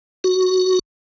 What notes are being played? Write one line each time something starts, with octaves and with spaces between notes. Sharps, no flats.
F#4